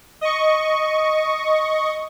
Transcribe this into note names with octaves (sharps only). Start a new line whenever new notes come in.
D#5 C#6